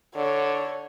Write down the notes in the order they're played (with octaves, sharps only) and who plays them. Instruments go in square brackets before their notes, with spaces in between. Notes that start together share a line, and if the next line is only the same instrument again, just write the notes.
[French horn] D3 [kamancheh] C#5